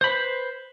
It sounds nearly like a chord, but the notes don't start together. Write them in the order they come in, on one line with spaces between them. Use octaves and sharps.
C5 B5 B4